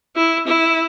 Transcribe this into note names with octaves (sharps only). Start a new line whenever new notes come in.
E4
E4